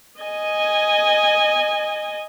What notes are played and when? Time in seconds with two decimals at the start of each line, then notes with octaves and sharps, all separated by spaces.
0.20 D#5 G#5